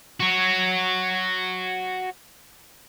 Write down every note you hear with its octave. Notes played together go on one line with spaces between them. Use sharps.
F#4 C#5